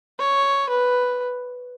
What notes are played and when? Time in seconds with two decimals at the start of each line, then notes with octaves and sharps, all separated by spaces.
0.20 C#5
0.70 B4